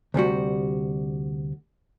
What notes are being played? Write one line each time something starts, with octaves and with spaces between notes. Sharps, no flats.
D2 C3 G3 F#4